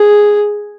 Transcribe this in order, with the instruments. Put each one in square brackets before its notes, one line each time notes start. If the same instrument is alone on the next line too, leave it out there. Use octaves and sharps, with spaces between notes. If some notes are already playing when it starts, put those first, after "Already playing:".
Already playing: [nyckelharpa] G#4